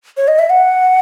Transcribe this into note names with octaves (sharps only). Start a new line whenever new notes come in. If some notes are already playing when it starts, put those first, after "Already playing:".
C#5
D#5
E5
F#5